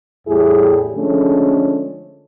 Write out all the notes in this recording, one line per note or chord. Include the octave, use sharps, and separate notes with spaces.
E2 A2 G3 E4 G4 G#4
D3 F3 G#3 A3 C#4